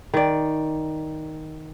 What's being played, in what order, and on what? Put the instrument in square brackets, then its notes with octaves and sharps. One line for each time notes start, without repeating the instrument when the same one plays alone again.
[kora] D#3 D5